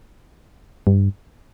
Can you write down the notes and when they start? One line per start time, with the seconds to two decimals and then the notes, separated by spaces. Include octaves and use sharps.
0.87 G2